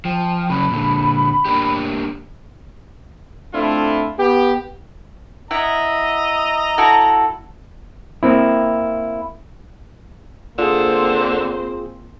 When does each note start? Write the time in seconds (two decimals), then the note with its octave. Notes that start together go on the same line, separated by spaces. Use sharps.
0.05 F3 G5
0.50 C#3 F#3 B5
0.70 A#2 D3
1.45 A#3 D4 G4
3.54 A3 C4 D4 E4 F4
4.18 B3 G4
5.51 E4 D#5 E5 F#5 A#5
6.78 E4 F#4 A4
8.23 A#3 C4 E4
10.59 D3 A#3 C4 F4 G#4 C5